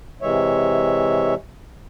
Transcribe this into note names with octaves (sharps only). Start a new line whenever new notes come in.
C3 E3 G#3 C#5 E5